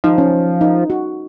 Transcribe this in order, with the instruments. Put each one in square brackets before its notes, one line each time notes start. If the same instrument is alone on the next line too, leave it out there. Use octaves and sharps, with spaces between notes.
[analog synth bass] F3 [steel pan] D#4
[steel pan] C#4
D#4
F#4